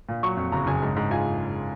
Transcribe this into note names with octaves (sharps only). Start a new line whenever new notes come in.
A#2
F#3 C#6
F2
F#1 A#5
F#1 G#5
G#2
G#2
F4 G#5